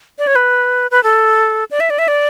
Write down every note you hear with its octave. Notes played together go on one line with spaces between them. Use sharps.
D5
C#5
B4
B4
A4
D5
E5
D5
E5
D5